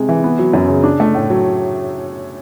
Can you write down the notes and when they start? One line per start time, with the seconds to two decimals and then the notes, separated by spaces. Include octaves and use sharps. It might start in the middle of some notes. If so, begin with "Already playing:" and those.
Already playing: C3 G#3
0.09 E3
0.24 B3
0.39 F#3
0.54 F#2
0.68 C#3
0.84 D4
1.00 A3
1.14 A2
1.30 F#3